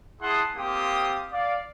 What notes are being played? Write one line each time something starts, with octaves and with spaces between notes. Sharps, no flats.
E4 G#4 F#5 A5 C6 D#6
A#3 C4 F4 G4 F5 D#6
D5 F5